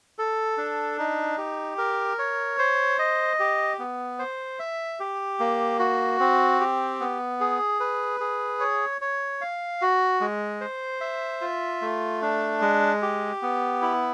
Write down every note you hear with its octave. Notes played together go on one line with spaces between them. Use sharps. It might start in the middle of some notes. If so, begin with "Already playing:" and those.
A4
D4
D#4
G4
A#4
C#5
C5
D#5
G4
B3
C5
E5
G4
A#3
F#4
C4
G4
B3
G#4
B4
G#4
C#5
C#5
F5
F#4
G#3
C5
E5
F4
A3
D4
G#3
G4
B3
E4